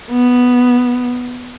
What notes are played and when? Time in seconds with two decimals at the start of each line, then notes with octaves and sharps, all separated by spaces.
0.11 B3